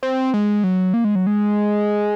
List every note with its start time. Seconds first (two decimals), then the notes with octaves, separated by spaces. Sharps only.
0.03 C4
0.34 G#3
0.64 F#3
0.94 A#3
1.04 G#3
1.15 F#3
1.27 G#3